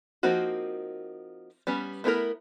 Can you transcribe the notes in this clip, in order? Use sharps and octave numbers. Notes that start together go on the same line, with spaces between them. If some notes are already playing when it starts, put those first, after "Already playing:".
F3 A#3 C4 D#4 F#4
G3 B3 C#4
A3 B3 E4 A#4